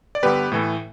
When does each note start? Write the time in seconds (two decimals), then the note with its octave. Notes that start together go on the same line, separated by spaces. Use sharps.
0.15 D5
0.23 G2 D3 G3 B3 G4 B4
0.52 A2 E3 A3